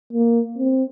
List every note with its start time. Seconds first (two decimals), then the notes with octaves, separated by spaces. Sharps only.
0.13 A#3
0.58 C4